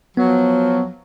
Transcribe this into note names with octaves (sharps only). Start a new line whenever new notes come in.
F3 F#3 B3